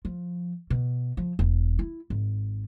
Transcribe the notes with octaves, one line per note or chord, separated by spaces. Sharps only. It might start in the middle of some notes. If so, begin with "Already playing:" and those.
F3
B2
F3
E1
E4
G#1